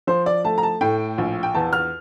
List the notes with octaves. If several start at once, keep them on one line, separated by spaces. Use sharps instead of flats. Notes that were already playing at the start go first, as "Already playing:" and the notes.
F3 C5
D5
A3 A5
A#5
A5
A2 G5
A#1
G5
E2 A5
F6